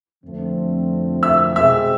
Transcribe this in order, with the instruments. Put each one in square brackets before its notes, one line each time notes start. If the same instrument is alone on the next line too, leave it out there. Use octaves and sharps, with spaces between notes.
[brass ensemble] F2 D3 F3 A3 C4
[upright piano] E5 E6
[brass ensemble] B2 G#3 C4 G#4 [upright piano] E5 E6